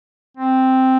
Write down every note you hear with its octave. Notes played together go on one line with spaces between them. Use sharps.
C4